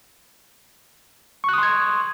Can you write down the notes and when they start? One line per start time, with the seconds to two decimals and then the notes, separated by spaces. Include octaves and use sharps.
1.44 C#6
1.49 F#6
1.53 D#6
1.58 C6
1.63 G#6